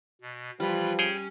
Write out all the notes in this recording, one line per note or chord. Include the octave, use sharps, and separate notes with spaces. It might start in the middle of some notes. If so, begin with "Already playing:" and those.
B2
E3 F3 G3 F4 B5
C#4 G#4 C#5 G5